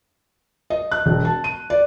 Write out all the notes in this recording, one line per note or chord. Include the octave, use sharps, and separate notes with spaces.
D#5
F#6
E1
A5
D#7
D5